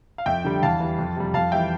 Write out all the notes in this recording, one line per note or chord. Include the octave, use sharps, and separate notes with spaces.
F5
F2 E5 G5
D3 G3
E2 F5 A5
E3 G3
F2
C3 G3
F2 F5 A5
E3 G3 E5 G5